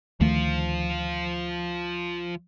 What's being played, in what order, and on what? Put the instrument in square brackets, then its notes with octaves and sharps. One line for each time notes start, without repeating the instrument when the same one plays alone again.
[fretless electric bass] D2 D#3 A3 [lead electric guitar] F3 F4